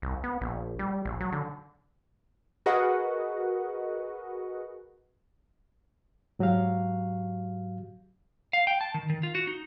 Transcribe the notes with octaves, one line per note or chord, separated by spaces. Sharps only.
C2
B3
A#1
G3
A#1
F#3
D3
F#4 G#4 A#4 B4 D#5 F#5
G#2 F#3 F#4 G4 F5
F5
G5
A5
D#3
D#3
F4
F#4
D#4